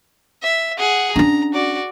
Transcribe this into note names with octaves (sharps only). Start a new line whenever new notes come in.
E5
G#4 F#5
C#4 D4 A#5
F#4 D5